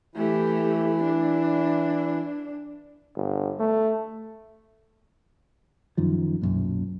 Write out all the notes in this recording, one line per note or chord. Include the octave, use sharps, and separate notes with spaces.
E3 A3 E4 G4
D4
G1
A3
F#2 D#3 F3
B1 F#2 A#2